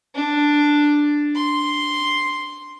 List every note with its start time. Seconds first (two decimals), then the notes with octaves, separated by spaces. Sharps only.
0.15 D4
1.35 C6